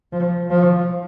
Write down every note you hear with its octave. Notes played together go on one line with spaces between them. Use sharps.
F3
F3